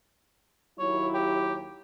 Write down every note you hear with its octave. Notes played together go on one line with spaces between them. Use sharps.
D#2 F#3 E4 C#5
G4